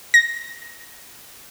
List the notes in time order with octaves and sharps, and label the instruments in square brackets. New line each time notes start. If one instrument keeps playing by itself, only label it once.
[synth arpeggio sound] A#6